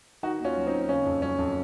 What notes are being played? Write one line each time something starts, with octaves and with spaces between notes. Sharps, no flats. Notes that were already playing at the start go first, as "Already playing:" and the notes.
D#3 D#4 F#4
D#2 C#4 F4
F#3
C4 D#4
D#2
C#3 C#4
F2
F#3 C#4
F2